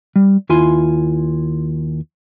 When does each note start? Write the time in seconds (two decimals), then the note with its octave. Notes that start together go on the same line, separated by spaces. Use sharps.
0.16 G3
0.49 D#2 E4 F4 G#5 C6